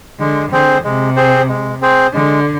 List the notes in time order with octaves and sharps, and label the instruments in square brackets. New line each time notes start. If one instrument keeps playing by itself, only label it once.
[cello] D3 [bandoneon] G#3
[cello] D3 [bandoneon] C4 G#4 C5
[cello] C3 [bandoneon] G#3
[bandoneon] C4 G#4 C5
G#3
C4 G#4 C5
[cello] D3 [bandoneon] G#3